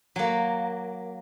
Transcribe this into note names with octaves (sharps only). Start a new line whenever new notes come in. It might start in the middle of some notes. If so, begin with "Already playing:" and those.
F#3 A#3